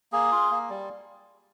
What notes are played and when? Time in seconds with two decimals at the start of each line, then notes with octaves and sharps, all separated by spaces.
0.12 A#3 G#4
0.32 F4
0.51 A#3
0.70 G3